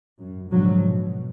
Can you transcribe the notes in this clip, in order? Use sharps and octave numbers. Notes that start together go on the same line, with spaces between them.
F#2
G#2 B2 D3 F3 F#3
B2